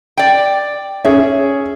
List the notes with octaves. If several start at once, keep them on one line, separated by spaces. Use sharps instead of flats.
D5 G5
C#4 G#4 E5